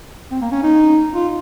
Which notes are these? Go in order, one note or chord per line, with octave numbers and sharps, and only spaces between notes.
C4
A#3
C#4
D#4
F4